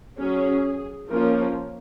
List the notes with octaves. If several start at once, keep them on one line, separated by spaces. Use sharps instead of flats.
F#3 C#4 G#4
F3 A#3 C#4 A#4